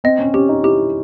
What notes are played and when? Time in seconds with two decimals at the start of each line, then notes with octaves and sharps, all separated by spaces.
0.04 C4 D#5
0.19 C#4
0.34 C#4 G4
0.49 D#4
0.64 E4 G4